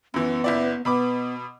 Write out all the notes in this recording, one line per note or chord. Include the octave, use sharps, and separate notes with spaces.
F#2 E3 B3
F#1 E4 D5
B2 B3 B5 D6